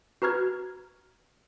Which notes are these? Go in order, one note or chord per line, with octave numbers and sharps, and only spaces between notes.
F#4 B4 A#5 F6 G#6